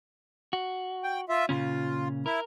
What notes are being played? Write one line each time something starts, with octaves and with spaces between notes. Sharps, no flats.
F#4
G5
F4 E5
A#2 C#3 C#4 F4
E4 A#4